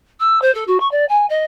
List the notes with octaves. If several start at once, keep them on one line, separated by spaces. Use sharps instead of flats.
E6
C5
A4
F#4
C#6
D5
G#5
D#5